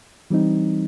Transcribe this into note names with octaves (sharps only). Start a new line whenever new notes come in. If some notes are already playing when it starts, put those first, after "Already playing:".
E3 G3 C4 D#4